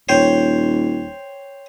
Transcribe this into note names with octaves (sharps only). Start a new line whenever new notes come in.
D#1 C5 C#5 G5